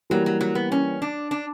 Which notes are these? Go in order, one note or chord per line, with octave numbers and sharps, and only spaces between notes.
E3 F#3 G3 A#3
F#3
F#3
B3
C#4
D4
D4